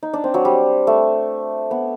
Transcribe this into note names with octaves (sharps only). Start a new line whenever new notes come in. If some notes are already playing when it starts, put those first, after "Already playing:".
D#4
D4
C4
F#3
G3
A3
B3